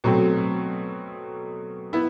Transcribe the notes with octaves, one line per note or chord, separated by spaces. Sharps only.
B2 F#3 A3 C4
B3 E4